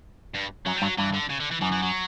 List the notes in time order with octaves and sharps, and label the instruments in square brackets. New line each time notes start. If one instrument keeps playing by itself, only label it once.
[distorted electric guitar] G2
[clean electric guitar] F#2 [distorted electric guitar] F#3
[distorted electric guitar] G3
[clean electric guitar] G2 [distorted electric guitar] F#3
[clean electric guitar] G2 [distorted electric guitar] E3
[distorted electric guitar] D3
C#3
D3
E3
[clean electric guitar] F#2 [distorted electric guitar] E3
[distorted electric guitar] E3
F#3